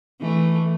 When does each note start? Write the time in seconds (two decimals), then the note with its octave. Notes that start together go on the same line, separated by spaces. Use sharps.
0.21 E3 A3